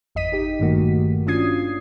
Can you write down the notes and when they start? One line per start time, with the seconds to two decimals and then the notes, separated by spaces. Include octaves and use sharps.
0.15 G#1 F2 D#5 B6 D#7
0.32 D#4 G4
0.59 G2 A#2 D#3 A3 A#3 F#4
1.27 C#4 D4 F4 D#6 G#6 C7